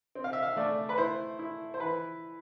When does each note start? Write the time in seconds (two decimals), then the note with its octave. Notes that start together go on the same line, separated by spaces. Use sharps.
0.15 C4
0.24 F5
0.33 E5
0.43 F5
0.56 A3 D5
0.89 B4
0.98 E4 C5
1.39 E4
1.74 C5
1.80 E3 B4